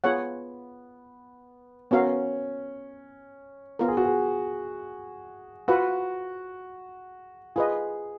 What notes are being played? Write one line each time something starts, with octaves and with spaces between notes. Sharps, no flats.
B3 F4 G#4 C#5 F#5
B3 C#4 F#4 A#4 F5
B3 F4 A#4
G#4
F#4
G#4
F4 F#4 B4 F#5
F4 G#4 B4 D#5